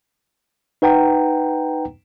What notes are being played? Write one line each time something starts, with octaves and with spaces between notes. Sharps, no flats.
D#4 B4 F#5 G5 A#5